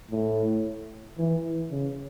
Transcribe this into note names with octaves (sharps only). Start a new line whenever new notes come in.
A2
E3
C#3